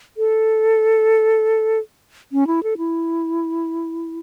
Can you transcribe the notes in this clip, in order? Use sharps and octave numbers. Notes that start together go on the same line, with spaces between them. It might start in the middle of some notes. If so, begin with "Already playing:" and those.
A4
C#4
E4
A4
E4